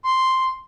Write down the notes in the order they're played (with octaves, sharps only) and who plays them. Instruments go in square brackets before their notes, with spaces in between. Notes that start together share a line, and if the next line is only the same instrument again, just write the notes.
[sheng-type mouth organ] C6